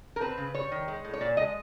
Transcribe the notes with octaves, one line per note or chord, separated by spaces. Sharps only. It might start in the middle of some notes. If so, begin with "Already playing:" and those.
A#4
C4 B4
C#3
G3 C#5
D#3
G#3
A2
C#5
A#2 D5
G#3 D#5